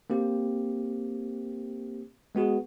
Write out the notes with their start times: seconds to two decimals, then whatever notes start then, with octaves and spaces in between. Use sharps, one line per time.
0.10 A#3 C4 G4
2.35 G#3 B3 F#4 G#4